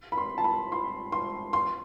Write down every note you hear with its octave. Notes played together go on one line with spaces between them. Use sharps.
B5
C6
A5
B5
C6
C6
C6